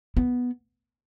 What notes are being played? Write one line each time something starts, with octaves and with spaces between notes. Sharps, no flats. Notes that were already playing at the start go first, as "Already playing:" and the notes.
B3